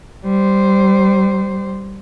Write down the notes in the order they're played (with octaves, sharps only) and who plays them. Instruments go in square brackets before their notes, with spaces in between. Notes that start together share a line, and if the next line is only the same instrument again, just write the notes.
[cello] G3 C5